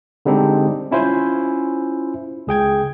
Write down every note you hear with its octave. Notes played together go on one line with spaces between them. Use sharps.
D3 G3 G#3 C4 D4 D#4
C#4 E4 F4 C5 G#5
C#2 G#4 G5 G#6